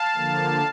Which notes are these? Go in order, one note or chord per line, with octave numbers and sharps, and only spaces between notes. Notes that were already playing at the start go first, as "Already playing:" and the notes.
Already playing: F5 A5
D3 F3 A#3